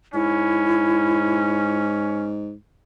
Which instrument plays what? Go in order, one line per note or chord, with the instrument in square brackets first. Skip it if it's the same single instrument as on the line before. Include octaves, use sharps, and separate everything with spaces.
[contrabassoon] G#2 [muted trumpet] C#4 [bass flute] E4